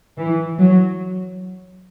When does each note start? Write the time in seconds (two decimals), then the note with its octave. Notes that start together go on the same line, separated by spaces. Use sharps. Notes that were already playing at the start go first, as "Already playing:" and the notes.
0.18 E3
0.59 F#3